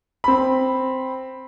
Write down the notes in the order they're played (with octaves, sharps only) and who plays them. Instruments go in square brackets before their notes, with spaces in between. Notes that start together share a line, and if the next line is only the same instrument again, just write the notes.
[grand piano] C4 B5